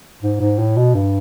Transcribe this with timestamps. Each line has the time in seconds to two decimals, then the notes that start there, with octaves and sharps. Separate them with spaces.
0.22 G#2
0.40 G#2
0.59 A2
0.77 B2
0.94 G2